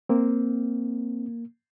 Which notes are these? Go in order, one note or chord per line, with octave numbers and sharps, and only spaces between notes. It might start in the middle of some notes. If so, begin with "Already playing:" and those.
A#3 C4